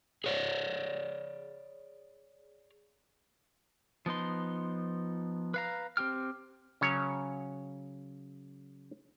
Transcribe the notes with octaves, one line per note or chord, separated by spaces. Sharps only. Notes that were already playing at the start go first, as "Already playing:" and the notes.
G#4 C#5 D5
F3 B3 D#4 C6
B4 F5 A#5
C4 G4 G5 F6
C#3 F#3 C#4 C#5